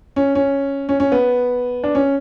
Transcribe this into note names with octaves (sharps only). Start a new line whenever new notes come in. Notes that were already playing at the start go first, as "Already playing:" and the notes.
C#4
C#4
C#4
C#4
B3
D4
C#4